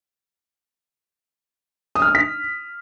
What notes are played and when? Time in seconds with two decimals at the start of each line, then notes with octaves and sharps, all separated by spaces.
1.95 D#6
2.02 F6
2.08 D#6
2.15 B6